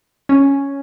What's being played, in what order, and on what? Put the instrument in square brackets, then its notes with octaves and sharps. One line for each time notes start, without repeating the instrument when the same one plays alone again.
[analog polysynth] C#4